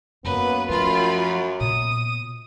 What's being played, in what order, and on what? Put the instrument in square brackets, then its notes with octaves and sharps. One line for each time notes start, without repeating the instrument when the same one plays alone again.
[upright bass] F#2 [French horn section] F#3 A#3 B3 [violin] B4
[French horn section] F#2 [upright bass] F3 A3 [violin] F4 B5
[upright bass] A#2 B3 [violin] D#6